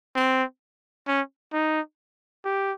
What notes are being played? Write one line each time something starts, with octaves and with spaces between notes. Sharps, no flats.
C4
C#4
D#4
G4